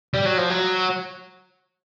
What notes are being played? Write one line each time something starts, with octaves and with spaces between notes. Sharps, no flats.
G3
F#3
F3
F#3